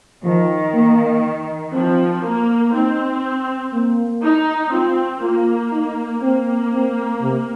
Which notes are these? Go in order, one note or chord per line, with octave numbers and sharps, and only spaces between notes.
D#3 F3
A#3
F3 C4
A#3
C4 D#4
A#3
D#4
C4 F4
A#3 F4
D#4
A#3 C4
C4
C3